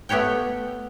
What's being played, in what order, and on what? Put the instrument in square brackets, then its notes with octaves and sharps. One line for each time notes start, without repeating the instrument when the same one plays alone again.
[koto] A3 B3 G4 C#5 G5